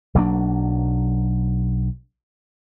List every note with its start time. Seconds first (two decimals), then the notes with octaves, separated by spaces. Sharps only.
0.15 B1 F#3 A#3 D4